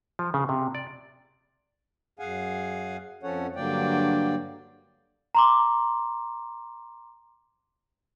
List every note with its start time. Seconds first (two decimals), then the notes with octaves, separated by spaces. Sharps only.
0.19 F3
0.34 C#3
0.49 C3
0.75 D5
2.19 F#2 G#4 F5 F#5 G#5
3.23 F2 F3 C#4 A4 C#5 F#5
3.56 G2 D3 F#3 A#3 D5 G5
5.35 A#5 C6 D6